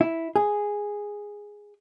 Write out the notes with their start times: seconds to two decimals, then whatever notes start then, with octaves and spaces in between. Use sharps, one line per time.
0.01 E4
0.36 G#4